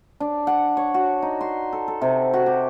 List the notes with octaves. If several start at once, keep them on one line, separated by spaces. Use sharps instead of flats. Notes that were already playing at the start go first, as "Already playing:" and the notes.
D4
F#5
C#5
F#4
D#4
C6
A4
A4
C3
F#4
G4